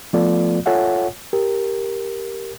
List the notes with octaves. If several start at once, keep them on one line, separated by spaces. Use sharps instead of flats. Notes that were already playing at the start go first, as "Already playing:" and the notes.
F3 A3 B3 F4 A4 D5
F4 A4 C#5 E5 F#5 G#5
G4 A#4